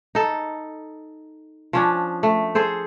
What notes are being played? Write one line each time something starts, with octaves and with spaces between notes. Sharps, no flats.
D#4 A4
F3 C#4 D4
A3
G#4 A4 C5